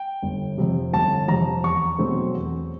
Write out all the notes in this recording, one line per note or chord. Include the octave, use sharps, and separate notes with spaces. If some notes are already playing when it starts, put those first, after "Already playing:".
Already playing: G5
G1
F2 C3
G1 A5
F2 C3 A#5
E2 C#6
B2 F#3 A3 C4
E2